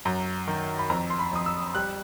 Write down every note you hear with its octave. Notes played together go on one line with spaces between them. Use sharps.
F#2 A#5
D#3
B5
F2 A#5
C6
B5
F2 D#6
E6
G3 F#6